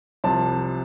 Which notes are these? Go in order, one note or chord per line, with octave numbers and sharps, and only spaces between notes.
C2 C3 F3 A5